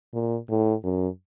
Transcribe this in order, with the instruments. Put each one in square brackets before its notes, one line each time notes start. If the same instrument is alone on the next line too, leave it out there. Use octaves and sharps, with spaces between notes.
[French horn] A#2
A2
F#2